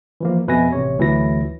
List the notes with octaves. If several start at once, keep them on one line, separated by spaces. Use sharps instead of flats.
E3 F3 A#3
F2 B2 B4 E5 G#5 A#6
A1 C3 C#5
D2 E3 F#3 E4 A#6